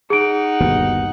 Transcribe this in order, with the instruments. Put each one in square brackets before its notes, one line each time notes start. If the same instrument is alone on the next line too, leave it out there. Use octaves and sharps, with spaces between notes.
[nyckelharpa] D#4 F#5 [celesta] G#4 D7
[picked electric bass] G1 D#2 B2